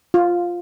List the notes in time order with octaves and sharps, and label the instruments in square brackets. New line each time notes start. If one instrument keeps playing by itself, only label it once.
[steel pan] F4